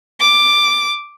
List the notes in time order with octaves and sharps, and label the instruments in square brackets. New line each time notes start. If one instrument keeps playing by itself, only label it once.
[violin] D6